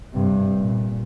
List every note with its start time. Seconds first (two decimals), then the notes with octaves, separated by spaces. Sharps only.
0.14 G2 C3
0.57 A#2